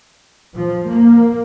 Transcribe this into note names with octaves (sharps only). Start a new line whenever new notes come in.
F3
A#3